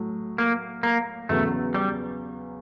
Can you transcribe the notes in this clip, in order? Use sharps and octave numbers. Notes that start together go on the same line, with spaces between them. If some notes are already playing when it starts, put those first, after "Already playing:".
Already playing: A2 F#3 A3
A#3
A#3
E2 C#3 F#3 A3 B3
G3